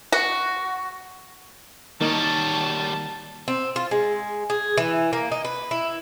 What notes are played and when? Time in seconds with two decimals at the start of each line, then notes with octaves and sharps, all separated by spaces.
0.12 F#4
2.01 D#3 G3 A#3 D#4 C#5 A5
3.48 C4
3.76 F4
3.91 G#3
4.50 G#4
4.77 E3
5.13 A#3
5.32 D#4
5.45 B4
5.71 E4